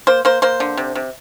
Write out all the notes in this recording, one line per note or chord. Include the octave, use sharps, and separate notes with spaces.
A#3 C5
A#3 C5
A#3 C5
D3
C3
C3